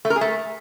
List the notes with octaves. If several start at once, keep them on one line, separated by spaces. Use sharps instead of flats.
A3
A#4
G#4
A3